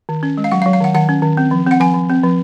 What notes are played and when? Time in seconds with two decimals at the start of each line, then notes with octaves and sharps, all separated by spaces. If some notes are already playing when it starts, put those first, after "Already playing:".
0.09 D#3
0.23 C#4
0.37 G#3
0.44 F5
0.51 F#3 F#5
0.62 F5
0.66 F#3
0.73 F5
0.80 D#3 F#5
0.94 D#3 F#5
1.09 C#4
1.22 D#3
1.37 C4
1.51 F3
1.66 C4 F#5
1.80 F3 G#5
1.94 F3
2.09 C4
2.24 F3